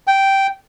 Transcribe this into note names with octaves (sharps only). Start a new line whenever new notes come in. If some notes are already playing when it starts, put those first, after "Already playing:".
G5